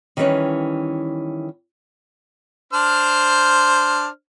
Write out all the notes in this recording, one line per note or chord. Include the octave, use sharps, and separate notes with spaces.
D#3 E3 G3 A3 C#4 B4
D4 C5 F6